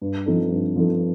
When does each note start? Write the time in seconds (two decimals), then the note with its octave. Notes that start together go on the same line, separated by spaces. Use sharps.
0.02 G2
0.26 F3 C4 D#4 A4
0.51 G2
0.76 F3 C4 D#4 A4